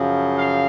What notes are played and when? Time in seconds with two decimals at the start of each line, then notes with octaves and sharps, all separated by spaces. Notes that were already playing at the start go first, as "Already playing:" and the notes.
Already playing: F#2 C#3 F3
0.36 F5